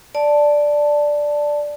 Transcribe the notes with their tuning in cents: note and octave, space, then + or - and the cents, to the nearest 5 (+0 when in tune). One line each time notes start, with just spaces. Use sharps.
D5 +0 A5 +0